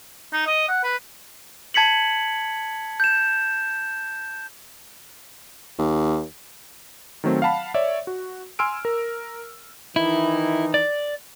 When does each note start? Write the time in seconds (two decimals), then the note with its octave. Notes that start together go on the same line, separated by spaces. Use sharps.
0.33 D#4
0.46 D#5
0.68 F#5
0.83 B4
1.74 A5 G#6 B6 C#7 F#7
3.00 G6 E7
5.79 D#2
7.24 D#3 F#3 A3 C4
7.42 F5 F#5 A5 B5
7.74 C#5 D5 E5
8.07 F#4
8.59 G#5 C6 E6 F6 D7
8.85 A#4
9.96 D#3 E3 D#4 E4
10.74 D5